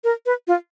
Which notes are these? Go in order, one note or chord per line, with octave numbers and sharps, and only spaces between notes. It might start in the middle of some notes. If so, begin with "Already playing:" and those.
A#4
B4
F4